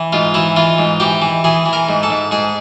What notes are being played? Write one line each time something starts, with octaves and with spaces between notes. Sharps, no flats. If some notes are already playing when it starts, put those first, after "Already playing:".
Already playing: E3
G#2 F4
E3 E4
E3 F4
G#2
E3 G4
E3
E3 G#4
E3
A#4
G#2
A4
G#2
G#2 G#4